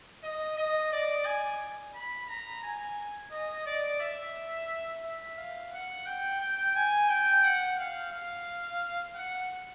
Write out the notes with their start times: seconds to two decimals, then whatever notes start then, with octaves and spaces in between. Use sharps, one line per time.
0.24 D#5
0.58 D#5
0.93 D5
1.26 G#5
1.95 B5
2.29 A#5
2.64 G#5
3.32 D#5
3.66 D5
4.01 E5
5.04 E5
5.38 F5
5.73 F#5
6.06 G5
6.41 G5
6.76 G#5
7.09 G5
7.44 F#5
7.79 F5
8.12 F5
9.16 F#5